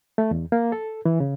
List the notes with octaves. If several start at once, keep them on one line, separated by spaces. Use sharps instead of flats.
A3
E2
A#3
A4
E3
C#3